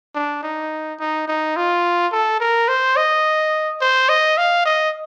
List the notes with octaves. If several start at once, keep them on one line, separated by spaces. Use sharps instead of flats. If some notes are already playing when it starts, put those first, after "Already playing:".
D4
D#4
D#4
D#4
F4
A4
A#4
C5
D#5
C5
D#5
F5
D#5